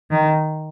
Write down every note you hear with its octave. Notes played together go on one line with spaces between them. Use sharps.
D#3